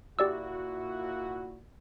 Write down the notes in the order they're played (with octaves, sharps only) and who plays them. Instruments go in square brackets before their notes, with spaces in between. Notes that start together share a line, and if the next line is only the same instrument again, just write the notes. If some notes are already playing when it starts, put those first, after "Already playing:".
[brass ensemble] A#2 E4 F#4 [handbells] G4 D5 E6